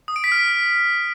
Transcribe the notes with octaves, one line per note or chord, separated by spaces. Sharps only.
D#6
D7
B6
F6